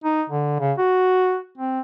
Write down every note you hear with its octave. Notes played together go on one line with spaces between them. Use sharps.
D#4
D3
C#3
F#4
C4